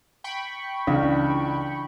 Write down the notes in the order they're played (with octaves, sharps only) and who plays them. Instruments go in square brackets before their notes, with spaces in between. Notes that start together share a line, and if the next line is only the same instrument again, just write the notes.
[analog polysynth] G5 B5 C#6
[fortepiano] C#2 [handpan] E3 D4 F5